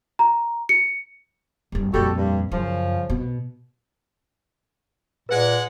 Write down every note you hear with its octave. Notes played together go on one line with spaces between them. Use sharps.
A#5
C#7
G#1 G2
F2 A#2 G3 F#4 A4
G2
F#2 C#3 F3
B2
A#2 G#3 B4 F#5